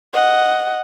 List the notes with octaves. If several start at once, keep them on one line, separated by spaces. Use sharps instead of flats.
D#5 F#5